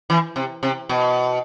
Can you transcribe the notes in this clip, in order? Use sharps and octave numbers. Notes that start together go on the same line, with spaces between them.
E3
C3
C3
B2